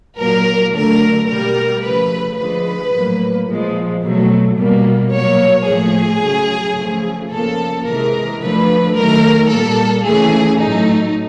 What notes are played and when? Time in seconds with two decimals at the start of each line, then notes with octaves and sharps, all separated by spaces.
0.17 A#2 F#3 A#3 A#4
0.73 D3 F#3 A3 A#4
1.28 B2 G3 A#3 A#4
1.83 C#3 F3 A3 B4
2.37 D3 F3 G#3 B4
2.92 A2 F#3 A#3
3.48 A#2 F3 G#3
4.02 B2 F#3 A3
4.57 B2 G3 A#3
5.12 A#2 F#3 A#3 C#5
5.67 A2 F3 A3 G#4
6.21 C#3 F#3 A3
6.76 C#3 F3 A3
7.31 C#3 F3 A#3 A4
7.86 C3 E3 G#3 A#4
8.41 D3 F3 A3 B4
8.96 D#3 F#3 A3 A#4
9.51 A#2 G3 A#3 A4
10.06 C#3 E3 A3 G#4
10.61 A2 F#3 A3 D#4